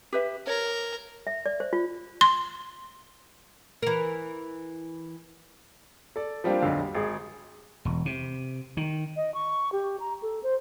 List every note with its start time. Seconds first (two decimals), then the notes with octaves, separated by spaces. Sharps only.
0.13 G4 B4 E5
0.47 A#4 C#5
1.27 E5
1.46 D5
1.60 C5
1.73 F4
2.21 C6
3.82 E3 A#4
6.16 A4 D5
6.44 F3 G3 A#3 C4 D4 F4
6.61 B1 F2 D3 F5
6.81 G3
6.95 G#1 G#4
7.85 E1
8.06 C3
8.77 D#3
9.16 D#5
9.34 C#6
9.72 G4
10.00 A#5
10.22 A4
10.43 C5